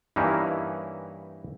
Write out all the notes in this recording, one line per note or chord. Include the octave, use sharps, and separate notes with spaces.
G2 E3 A#3 C#4 D#4 E4